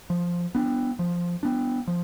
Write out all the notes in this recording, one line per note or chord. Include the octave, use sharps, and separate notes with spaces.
F3
B3 D4
F3
B3 D4
F3